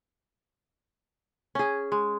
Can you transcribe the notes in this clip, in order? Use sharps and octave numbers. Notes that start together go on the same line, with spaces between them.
C#4 G#4
G#3